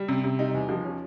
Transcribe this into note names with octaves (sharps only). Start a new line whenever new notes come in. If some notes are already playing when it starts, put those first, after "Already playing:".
Already playing: G3
C3
C3
G3 D#4
E2
F3
C#4